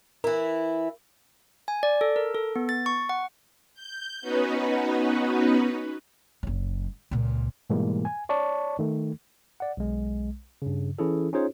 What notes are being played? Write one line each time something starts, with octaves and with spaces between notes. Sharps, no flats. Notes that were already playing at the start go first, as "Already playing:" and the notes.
E3 E4 A#4
G#5
D5
A4
A#4
A4
B3
A6
C#6
F#5
G6
B3 C#4 D#4 F#4 B4
F#1 F#3
C#2 A#2
G#2 B2 E3 G3 G#3 A#3
G#5
C#5 D5 A5 C#6
D#3 A3
D5 F#5
B1 G#3
G2 C#3
E3 C#4 E4 G#4 A4
C#4 D#4 F4 G#4 C5 C#5